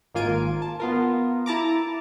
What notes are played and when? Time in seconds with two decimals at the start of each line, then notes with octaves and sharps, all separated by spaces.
0.14 G#1 A#3 F4 G#5 D7
0.62 A5
0.80 B3 F4 A#4
1.46 E4 A5 A#5 D6